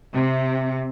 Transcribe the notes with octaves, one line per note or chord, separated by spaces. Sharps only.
C3